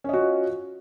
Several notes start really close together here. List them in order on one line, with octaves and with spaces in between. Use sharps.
C#4 D#5 F#4 F4